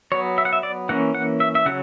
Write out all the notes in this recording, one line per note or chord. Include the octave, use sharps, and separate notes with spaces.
F#3 B3 C#5
E5
F#5
E5
D5
E3 A#3 C#4 F#5
F#5
E5
E5
C#3 F#3 F#5